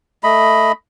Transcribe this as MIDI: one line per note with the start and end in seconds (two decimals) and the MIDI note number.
0.24 0.72 57
0.24 0.72 75
0.24 0.72 83